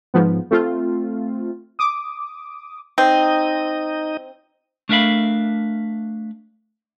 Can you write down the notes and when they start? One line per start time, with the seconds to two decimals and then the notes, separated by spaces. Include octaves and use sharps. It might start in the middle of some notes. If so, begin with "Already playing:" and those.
0.14 G#2 F3 B3
0.51 A3 C4 F4
1.79 D6 D#6
2.98 C4 D#4 D#5
4.89 A3 D4 A#4 E5 F5 B5